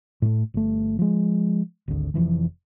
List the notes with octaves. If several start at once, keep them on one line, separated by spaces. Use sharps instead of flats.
A2 A3
G1 A3
F3 G#3
G#1 D2
F1 E3 F3